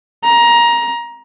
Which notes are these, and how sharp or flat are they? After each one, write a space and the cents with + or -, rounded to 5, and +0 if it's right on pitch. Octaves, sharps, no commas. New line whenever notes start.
A#5 +20